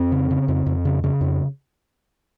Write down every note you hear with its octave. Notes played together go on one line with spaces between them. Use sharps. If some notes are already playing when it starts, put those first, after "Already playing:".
Already playing: F2 C4
C#3
C#3
F2
F2
C#3
C#3
F2